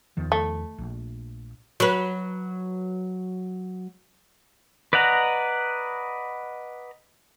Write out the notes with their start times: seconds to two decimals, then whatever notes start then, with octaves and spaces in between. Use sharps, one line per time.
0.17 E2 D#3 F3
0.32 A3
0.78 A#1
1.80 F#3 B4
4.93 B4 D5 D#5 F#5 A#5